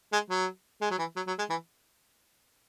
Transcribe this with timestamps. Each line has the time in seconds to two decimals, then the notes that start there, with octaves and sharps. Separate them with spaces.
0.12 G#3
0.30 F#3
0.81 G#3
0.91 F#3
0.98 E3
1.16 F#3
1.27 F#3
1.38 G#3
1.50 E3